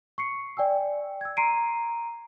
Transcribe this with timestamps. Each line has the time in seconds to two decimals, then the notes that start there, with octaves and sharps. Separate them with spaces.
0.18 C#6 C7 C#7
0.57 D5 G5 G#5 E6
1.21 E6 G#6
1.37 A#5 C6 C7 D7 D#7